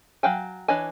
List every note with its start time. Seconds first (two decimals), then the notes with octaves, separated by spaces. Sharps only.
0.23 F#3 F5 G5 G#5
0.68 E3 D4 C#5 D#5 G#5